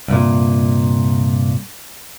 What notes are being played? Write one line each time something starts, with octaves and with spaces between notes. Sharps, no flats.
C2 G2 A#2